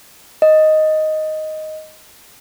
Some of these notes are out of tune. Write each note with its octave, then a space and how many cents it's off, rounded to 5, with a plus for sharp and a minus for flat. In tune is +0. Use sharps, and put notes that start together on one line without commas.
D#5 +0